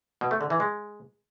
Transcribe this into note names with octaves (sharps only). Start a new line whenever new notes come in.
B2
A3
D3
E3
G#3